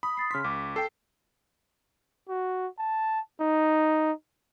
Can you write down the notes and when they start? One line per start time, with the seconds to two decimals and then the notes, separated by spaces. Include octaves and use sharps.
0.03 B5 D#6
0.17 D#6 A6 C7
0.31 C#3 C6 F6 B6
0.44 C#2 D6
0.76 A4 G5 C7
2.29 F#4
2.78 A5
3.40 D#4